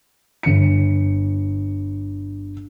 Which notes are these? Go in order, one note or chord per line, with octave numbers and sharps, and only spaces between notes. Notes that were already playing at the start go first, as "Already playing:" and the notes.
G1 C#7